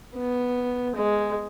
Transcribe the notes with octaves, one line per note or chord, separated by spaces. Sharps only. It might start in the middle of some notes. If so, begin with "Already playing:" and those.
B3
G#3